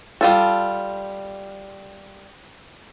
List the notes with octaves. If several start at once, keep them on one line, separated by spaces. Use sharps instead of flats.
G3 F4 A4